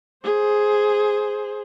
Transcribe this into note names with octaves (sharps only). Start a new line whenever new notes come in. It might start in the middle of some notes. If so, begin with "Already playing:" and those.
G#4 C5